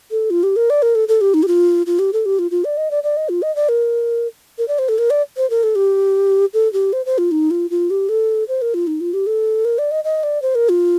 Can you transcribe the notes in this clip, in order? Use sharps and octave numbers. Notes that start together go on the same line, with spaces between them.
A4
F4
G4
A#4
D5
A#4
A4
A4
G4
D#4
G4
F4
F4
G4
A4
G4
F4
F4
D5
D#5
D5
D5
D#5
F4
D#5
D5
A#4
A#4
D5
C5
A4
A#4
D5
C5
A#4
A4
G4
A4
G4
C5
C5
F4
D#4
F4
F4
G4
A4
C5
A#4
F4
D#4
F4
G4
A4
A#4
D5
D#5
D#5
D5
C5
A#4
F4